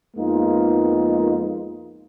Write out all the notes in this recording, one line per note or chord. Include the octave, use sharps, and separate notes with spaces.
F2 G#3 A#3 B3 D#4 F4